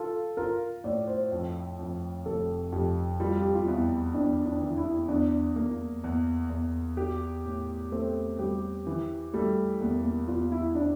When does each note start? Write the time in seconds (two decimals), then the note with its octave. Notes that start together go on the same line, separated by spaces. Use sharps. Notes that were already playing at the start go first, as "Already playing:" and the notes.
Already playing: F4 A4
0.37 F4 A#4
0.84 A2 D5
1.07 C5
1.32 F2
1.79 F2
2.26 F1 A4
2.72 F2 G4
3.20 G3 F4
3.42 G4
3.55 F4
3.67 E2 E4
4.14 E2 D4
4.46 D4
4.61 E3
4.77 E4
5.08 E2 D4
5.56 E2 A#3
6.04 E2
6.50 E2
6.97 G4
7.45 A2
7.92 A3 C4
8.39 G3 G4
8.87 E3
9.33 G3 A3
9.81 E2 A#3
10.04 A#3
10.28 E2 F4
10.52 E4
10.75 D4